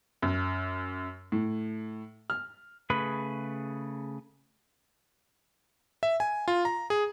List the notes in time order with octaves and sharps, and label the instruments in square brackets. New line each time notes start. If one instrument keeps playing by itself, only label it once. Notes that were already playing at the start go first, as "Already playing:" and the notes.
[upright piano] F#2
A2
F6
[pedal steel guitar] C#3 A3 G#4 B4 B5
[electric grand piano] E5
G#5
F4
A#5
G#4